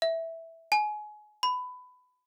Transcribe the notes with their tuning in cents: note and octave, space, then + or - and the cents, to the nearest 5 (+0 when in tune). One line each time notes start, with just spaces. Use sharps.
E5 -5
G#5 +25
B5 +20